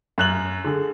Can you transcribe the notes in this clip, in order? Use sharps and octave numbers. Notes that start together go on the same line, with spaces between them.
F#2 F#6 F#7
D3 G#4